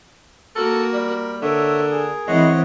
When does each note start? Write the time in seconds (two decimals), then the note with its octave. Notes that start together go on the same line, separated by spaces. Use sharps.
0.56 A#3 F#4 A4 A#4
0.94 G3
1.42 D3 A#4 C#5 E5
1.91 G#4
2.28 E3 G#3 C4 C#5 D#5 F#5